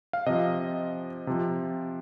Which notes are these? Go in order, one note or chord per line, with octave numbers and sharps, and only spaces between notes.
F5
C3 F3 D#5
C3 F3